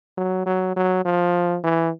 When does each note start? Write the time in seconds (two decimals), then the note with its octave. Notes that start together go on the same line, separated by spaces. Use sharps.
0.17 F#3
0.46 F#3
0.76 F#3
1.05 F3
1.64 E3